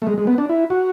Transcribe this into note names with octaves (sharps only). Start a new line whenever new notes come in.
A3
G#3
G#3
B3
D4
E4
F#4